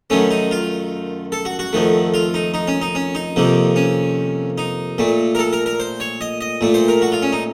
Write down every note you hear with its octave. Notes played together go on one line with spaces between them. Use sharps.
F#2 D#3 A3 C#4
D#4
F4
A4
F#4
F#4
F2 D#3 A3
F4
D#4
D#4
C#4
D#4
C#4
D#4
F2 C3 D#3 A#3
C#4
D#4
A#2 A3
A#4
A4
A#4
A#4
C5
C#5
D#5
D#5
A#2 A3
C5
A#4
F#4
F4
C#4
D#4